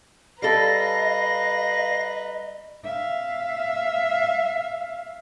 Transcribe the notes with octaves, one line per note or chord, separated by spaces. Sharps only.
G3 A4 B4 D#5 F5 A#5 A#6
E5 F5